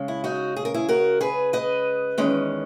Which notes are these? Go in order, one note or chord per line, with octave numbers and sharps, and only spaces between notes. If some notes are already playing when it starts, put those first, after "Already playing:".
Already playing: C#3 G#3 C#4
E4
D#4 F#4
G#4
A#4
E4 G#4
F#4 A#4
G#4 B4
B4 D#5
E2 D#3 G#3 C#4